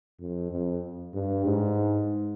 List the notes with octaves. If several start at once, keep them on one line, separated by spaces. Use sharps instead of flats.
F2
F2
G2
G#2